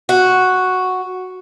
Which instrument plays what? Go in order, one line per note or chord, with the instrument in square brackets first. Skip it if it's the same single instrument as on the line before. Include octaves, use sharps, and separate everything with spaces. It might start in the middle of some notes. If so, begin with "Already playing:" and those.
[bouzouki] F#4